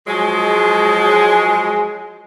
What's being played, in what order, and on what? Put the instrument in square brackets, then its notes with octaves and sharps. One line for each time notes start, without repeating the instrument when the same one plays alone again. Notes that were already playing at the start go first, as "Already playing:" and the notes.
[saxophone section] F3 F#3 G#3